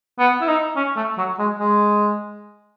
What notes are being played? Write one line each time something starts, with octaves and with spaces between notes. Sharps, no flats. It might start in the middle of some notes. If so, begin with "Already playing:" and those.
B3
E4
D#4
C#4
A3
F#3
G#3
G#3